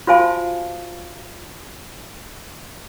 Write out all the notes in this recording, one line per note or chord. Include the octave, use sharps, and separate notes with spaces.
F4 F#4 C5 F5 G#5 A5